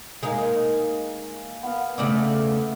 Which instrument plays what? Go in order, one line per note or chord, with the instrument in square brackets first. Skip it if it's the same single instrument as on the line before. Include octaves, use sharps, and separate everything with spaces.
[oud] G#3 D#4 [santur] A#3 G#5
[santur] B3 F5
[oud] C#3 A3 D5